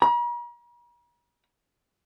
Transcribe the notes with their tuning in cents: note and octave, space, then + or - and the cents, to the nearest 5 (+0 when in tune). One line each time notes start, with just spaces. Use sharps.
A#5 +45